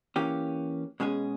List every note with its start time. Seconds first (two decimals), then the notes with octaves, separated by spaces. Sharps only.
0.16 E3 A#3 C#4 G4
1.00 B2 G#3 C#4 G#4